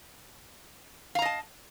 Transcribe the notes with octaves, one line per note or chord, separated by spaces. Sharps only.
D#5 F5 A5 A#5